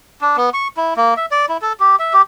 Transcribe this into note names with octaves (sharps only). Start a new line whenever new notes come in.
D4
B3
C#6
E4
A#3
E5
D5
E4
A4
G4
E5
G4